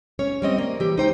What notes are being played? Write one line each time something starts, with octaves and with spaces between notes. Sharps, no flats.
C#4 C#5
G3 C4 D#5
A#3
E3 G4
D#4 C5 G5